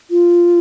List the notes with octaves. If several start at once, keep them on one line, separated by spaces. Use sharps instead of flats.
F4